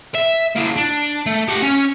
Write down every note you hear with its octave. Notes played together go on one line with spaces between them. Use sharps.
E5
A#3 E4
D4
A3
G4 F#5
C#4